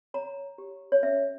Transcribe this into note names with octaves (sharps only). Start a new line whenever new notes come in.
C#5 A#5
G4
C#5
C#4 E5